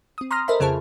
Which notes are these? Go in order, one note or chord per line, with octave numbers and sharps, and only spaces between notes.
C4 D#6
A#5 C6 D#6 F6 A#6
A4 A#4 C5 D#5 E5 B5
F2 C#3 F4 G#4 C5 A5